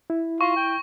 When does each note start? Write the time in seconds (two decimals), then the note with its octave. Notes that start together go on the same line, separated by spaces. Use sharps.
0.10 E4
0.41 F4 C#6
0.56 G5